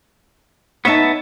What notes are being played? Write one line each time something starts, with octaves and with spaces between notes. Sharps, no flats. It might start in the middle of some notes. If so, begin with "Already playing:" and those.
B3 D#4 C#5 E5 A5